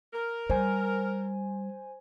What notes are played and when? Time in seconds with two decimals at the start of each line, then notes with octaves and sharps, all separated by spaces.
0.14 A#4
0.50 G3 C5 G#5